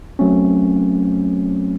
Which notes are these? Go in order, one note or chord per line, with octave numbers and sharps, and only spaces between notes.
F#3 A3 C4 C#4